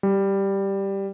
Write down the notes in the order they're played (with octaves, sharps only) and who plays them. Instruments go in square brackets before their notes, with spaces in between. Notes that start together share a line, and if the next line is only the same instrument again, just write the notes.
[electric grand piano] G3